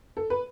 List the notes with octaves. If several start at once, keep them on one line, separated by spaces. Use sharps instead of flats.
A4
B4